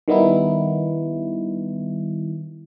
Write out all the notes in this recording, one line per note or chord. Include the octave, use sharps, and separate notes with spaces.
D#3 G3 B3 D#4 E4